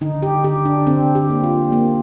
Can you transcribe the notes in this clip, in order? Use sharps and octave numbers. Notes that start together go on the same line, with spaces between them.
D3 D#4
G4
D3 G4
D4
D3 C4
G4
A#3
F4
A#3